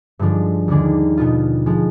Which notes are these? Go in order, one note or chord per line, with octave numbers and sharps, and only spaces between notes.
G2 D3 F3 G#3 D4
D#2 D3 G#3 D4 G#4
B2 B3 F4
F3 G#3